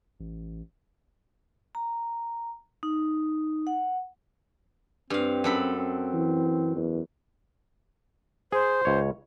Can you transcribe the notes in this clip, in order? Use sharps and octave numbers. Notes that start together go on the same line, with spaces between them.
A1
A#5
D#4
F#5
G2 C4 F5
F#2 A4 B5
C4
E3
E2
G#4 C5
C#2 C#5